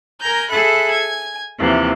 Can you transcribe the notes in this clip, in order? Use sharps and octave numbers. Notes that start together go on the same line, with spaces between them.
A#4 G#5 A#5 G6
G#4 A4 E5 B5 F#6
G#5 G#6
D#2 C3 E3 F3